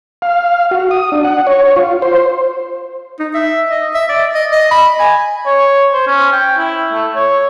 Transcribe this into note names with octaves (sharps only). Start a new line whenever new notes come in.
F5
F#4
D#6
D4
F#5
C#5
F4
C5
D#4
E5
D#5
E5
D5
D#5
D#5
B5
G#5
C#5
C5
C#4
G5
E4
A3
C#5